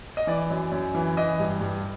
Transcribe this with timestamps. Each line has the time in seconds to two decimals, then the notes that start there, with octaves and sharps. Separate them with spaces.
0.17 D#5
0.27 E3 D5
0.50 F#2
0.72 F#2
0.94 E3
1.17 E3 D#5
1.40 G2
1.61 G2